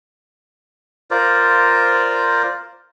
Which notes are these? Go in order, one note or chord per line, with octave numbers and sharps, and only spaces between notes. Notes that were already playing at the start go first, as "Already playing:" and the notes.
F4 A#4 C5 D5